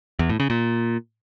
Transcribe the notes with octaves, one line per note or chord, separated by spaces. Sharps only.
E2
A2
C#3
A#2